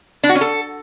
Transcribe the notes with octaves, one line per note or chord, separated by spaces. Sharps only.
D4
F#4
C#4
A4